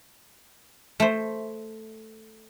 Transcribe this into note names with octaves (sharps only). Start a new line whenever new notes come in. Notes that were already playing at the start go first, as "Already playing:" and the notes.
A3 C5